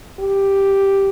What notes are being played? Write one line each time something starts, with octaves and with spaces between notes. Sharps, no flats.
G4